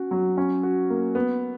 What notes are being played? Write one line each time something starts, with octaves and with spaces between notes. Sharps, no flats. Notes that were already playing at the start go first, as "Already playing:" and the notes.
Already playing: C#4 F#4
F#3
C#4
F#4
A#3
B3